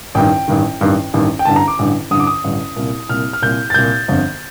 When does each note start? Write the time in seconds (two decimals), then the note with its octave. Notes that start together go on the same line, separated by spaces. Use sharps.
0.15 A1 G2 D#3 G5
0.48 A1 G2 D#3
0.81 A1 G2 D#3
1.14 A1 G2 D#3
1.39 G5
1.45 A1 G2 D3 A5
1.56 A#5
1.68 D6
1.79 A1 G2 D3
2.11 A1 G2 D3 D#6
2.20 D6
2.27 D#6
2.44 A1 G2 D3
2.76 C2 A#2
3.09 C2 A#2 F6
3.33 F6
3.42 C2 A#2 G6
3.70 A6
3.74 C2 A#2 G6
4.08 G1 F2 D3